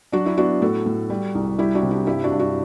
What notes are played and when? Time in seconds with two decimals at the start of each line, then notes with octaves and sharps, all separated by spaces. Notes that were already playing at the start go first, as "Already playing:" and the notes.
0.12 F#3 D4 F#4
0.26 E4
0.38 B3 D4 F#4
0.61 A2 F#4 A4
0.86 A2
1.10 G3
1.35 C2
1.58 G3 E4 G4
1.75 D4 F#4
1.83 C3
1.91 E4 G4
2.07 G2 E4 G4
2.24 D4 F#4
2.32 G2
2.40 D4 F#4